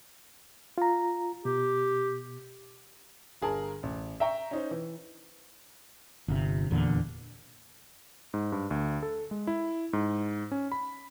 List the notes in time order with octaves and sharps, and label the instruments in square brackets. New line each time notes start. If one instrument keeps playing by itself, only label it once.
[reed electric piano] F4 A#5
[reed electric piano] B2 [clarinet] G4
[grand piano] G1 G#4 A#4 A5 A#5
A1
E5 G5 A#5 C#6
C#4 D#4 C5
E3
[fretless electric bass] G1 C3
F1 E2 A#2 D3
[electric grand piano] G#2
G2
D2
A4
G#3
E4
G#2
C#4
B5